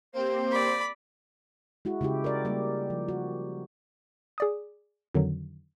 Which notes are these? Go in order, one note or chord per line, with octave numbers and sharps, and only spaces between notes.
A#3 C4 G4 C5
D5 B5
G#3 E4 F#4
C#3 G#3 E4 G4
A#4 D5
G3 A#3 G4
F3
F#4
G#4 D5 D#6
F2 D3 D#3 F#3